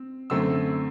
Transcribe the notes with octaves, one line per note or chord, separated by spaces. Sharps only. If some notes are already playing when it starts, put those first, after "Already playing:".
Already playing: C4
F#2 D3 A3 C4 E6